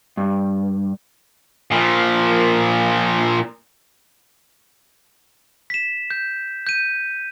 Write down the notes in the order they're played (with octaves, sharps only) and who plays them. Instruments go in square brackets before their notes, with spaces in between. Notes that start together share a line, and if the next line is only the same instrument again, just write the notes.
[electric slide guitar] G2
[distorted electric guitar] A#2 F3
[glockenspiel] B6 E7
G6
G6 D#7